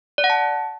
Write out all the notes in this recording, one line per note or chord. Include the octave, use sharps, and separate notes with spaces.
D5
F#5
A5